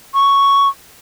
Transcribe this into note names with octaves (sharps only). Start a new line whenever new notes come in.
C#6